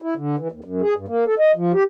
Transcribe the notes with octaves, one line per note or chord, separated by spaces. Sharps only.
E4
D3
E3
D#2
F#2
G#4
G2
A#3
A4
D#5
F3
G4